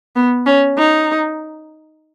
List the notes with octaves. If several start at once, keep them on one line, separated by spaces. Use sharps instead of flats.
B3
C#4
D#4